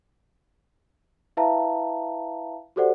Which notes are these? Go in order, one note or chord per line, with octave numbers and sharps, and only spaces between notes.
E4 B4 E5 F5 A5 A#5
F#4 G4 A4 C5 D5 F#5